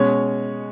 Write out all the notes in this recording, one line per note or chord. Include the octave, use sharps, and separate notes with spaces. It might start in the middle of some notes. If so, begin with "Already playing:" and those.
Already playing: B2 G#3 C#4 C#5